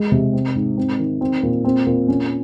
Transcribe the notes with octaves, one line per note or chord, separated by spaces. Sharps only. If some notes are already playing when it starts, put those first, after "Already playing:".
Already playing: G#3
C3
C4
G#2
C4
D#3
C4
A#2
C4
A#2
C#4